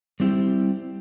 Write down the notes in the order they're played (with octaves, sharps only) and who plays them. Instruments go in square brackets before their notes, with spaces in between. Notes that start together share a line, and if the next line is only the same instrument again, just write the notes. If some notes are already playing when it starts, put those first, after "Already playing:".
[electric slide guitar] G3 C4 E4 G4